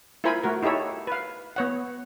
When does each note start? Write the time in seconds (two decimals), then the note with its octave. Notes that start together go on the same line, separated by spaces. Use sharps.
0.24 E4 F4 A#4 C5 G#5 B5
0.44 A3 F#4 A#4
0.63 D#4 E4 G4 A4 C#5
1.07 B4 F5
1.56 B3 C#5 F#5